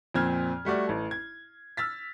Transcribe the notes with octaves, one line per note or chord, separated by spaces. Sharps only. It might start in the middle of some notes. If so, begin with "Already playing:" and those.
F2 A#2 C4 F6 G#6
G3 A3 F#4 D5
A1 A4
G#6
E6 F6 A6 B6